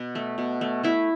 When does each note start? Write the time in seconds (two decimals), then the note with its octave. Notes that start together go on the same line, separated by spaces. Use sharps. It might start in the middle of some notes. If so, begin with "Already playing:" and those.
Already playing: B2
0.15 A3
0.38 B2
0.61 A3
0.83 A3 E4